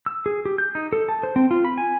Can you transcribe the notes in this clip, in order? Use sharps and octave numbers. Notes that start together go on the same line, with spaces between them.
E6
G#4
G4
G6
D#4
A4
A5
C5
C4
F4
B5
G#5